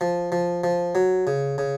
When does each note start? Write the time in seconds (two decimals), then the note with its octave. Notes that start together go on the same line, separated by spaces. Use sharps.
0.01 F3
0.32 F3
0.64 F3
0.95 F#3
1.27 C#3
1.58 C#3